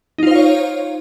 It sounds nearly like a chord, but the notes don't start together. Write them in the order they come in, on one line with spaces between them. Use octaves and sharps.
D#4 F4 C5 F5 C#5